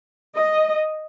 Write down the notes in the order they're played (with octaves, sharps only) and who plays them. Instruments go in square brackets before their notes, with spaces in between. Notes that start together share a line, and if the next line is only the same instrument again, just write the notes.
[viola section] D#5